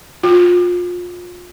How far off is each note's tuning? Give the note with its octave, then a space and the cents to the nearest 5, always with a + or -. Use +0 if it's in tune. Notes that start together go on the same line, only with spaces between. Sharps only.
F4 +25